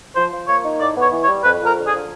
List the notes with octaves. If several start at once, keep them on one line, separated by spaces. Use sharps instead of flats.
F3 C5
F3
A#3 C#5
D#4
A2 D5
B3
C#5
E3
C#5
G3
F2 B4
F2
A#4
D3
G#4
F3